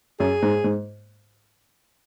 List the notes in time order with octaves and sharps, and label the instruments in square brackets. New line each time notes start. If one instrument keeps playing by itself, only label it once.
[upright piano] F#2 [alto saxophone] G#4
[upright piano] G#2
G#2